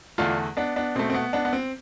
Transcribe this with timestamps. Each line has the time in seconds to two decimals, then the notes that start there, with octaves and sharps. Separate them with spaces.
0.18 E2 D3 A3 D4 F4
0.57 B3 D4
0.76 B3 D4
0.95 B2 A3 C4
1.10 C4
1.15 B3
1.33 B3 D4
1.45 B3
1.53 C4